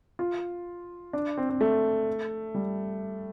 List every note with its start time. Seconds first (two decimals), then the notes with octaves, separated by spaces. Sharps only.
0.19 F4
1.13 D4
1.37 C4
1.50 C4
1.61 A3
2.55 G3